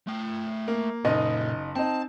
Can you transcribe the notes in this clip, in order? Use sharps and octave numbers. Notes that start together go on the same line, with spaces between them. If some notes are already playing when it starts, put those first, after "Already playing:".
A3 G5
A#3
F#1 A#2 D#4 A4 D#5
C4 D#4 A5